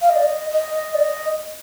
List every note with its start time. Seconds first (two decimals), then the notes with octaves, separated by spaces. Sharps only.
0.02 F5
0.10 D#5
0.16 D5
0.23 D#5
0.50 D#5
0.94 D5
1.00 D#5